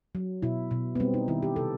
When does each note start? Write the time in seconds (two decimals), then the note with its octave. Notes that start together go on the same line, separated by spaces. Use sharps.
0.15 F#3
0.42 B2 E4
0.71 B2
0.95 B3
1.00 G3 C4
1.14 D#4
1.28 D#3 E4
1.42 G4
1.56 C3 A4